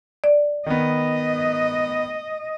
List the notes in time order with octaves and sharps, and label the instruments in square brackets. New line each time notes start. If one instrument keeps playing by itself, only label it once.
[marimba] D5
[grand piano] D#3 B3 [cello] D#5